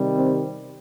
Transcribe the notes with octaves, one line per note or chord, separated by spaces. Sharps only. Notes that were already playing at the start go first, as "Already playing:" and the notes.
Already playing: C3 D#3 G3
C4